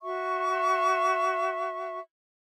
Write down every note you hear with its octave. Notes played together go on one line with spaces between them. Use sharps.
F#4 E5 C#6